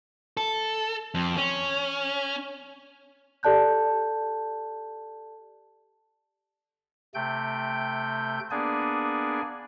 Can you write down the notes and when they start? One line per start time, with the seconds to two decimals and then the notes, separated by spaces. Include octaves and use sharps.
0.37 A4
1.14 F2
1.37 C#4
3.43 G4 A4 D5 A5 F#6 G6
7.14 C3 A3 G5 G6
8.51 A#3 B3 D4 G#4 D5 G#5